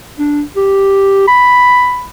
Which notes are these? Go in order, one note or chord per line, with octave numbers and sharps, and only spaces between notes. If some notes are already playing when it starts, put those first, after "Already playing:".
D4
G4
B5